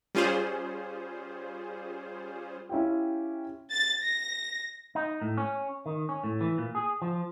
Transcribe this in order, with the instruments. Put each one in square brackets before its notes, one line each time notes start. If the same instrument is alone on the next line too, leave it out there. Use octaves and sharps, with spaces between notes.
[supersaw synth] G3 C#4 F4 G#4 C5
[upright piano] C#4 E4 F4 G4
[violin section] A6
A#6
[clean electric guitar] D#4
A2
C#4
D#3
C#4
A2
E3
A#2
G#4
F3